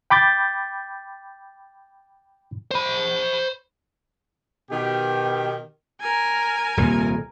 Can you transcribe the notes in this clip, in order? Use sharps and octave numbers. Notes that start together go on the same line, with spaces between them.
G5 B5 D6 G6 A6
C5 B5
B2 D#3 G4
A#4 G#5
D#1 C2 A#3